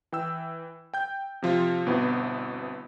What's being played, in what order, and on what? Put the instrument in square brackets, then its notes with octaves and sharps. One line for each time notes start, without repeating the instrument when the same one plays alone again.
[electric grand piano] E3 G5 E6
G5 G6
C3 F3 F4
G1 B2 B3 C4 E4